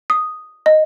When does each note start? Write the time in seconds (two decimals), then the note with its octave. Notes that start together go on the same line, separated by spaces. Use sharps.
0.10 D#6
0.66 D#5